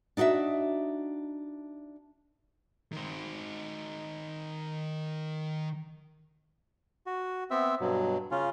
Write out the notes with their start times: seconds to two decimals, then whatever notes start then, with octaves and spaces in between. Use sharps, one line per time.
0.17 D4 D#4 F#4 D#5 E5
2.92 D#3 C5
7.06 F#4
7.51 B3 C4 E5
7.80 G2 B2 F#3
8.31 C#3 C#4 F4